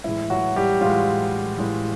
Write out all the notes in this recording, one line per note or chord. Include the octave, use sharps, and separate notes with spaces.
A2 E3 G#3 E4
F#3 F#4
G3 G4
A2 E3 G#3 F4
A2 E3 G#3